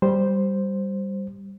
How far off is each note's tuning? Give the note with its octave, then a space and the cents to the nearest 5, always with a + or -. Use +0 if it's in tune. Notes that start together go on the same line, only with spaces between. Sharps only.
G3 +0 C5 +0